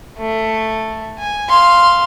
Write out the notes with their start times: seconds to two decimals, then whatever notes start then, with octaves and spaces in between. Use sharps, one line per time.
0.18 A3
1.19 G#5
1.49 F5 C6